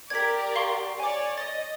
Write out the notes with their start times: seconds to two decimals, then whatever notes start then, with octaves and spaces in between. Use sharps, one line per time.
0.10 G4 A#4 D5 G#6 B6
0.56 F5 C6 C#6
1.00 C#5 D5 G#5 D6
1.38 D#5 A6